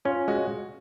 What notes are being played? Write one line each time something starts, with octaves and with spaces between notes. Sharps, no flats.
C#4 F4
G#3 F#4